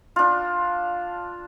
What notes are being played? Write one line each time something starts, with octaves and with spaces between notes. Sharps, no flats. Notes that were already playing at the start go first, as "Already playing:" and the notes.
D4 F4